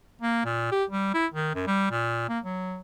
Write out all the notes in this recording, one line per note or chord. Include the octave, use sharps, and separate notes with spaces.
A#3
A#2
G4
G3
E4
D#3
F#2
G3
A#2
A#3
F#3